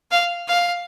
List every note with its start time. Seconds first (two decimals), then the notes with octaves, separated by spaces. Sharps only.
0.11 F5
0.48 F5